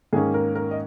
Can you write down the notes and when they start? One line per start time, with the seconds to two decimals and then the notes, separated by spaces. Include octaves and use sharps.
0.13 G#2 D#3 A#3 C#4 G#4
0.34 A#4
0.55 A#4
0.71 D#5